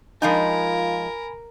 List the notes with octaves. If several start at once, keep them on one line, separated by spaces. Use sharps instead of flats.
F3 G#3 D#4 F4 A#4 G#5 B5